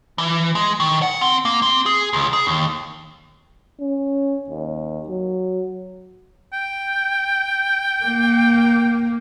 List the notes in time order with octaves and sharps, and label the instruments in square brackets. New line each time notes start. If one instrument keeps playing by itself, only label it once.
[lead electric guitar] E3
G#3
D#3
F#5
C4
A#3
C4
G#4
C#2
G#4
D#2
[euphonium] C#4
D#2
F#3
[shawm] G5
[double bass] A#3